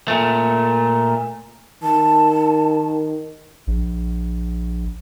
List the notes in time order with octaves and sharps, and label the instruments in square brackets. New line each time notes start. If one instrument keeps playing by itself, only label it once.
[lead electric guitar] A#2 A3
[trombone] D#3 [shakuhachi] A5
[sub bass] A#1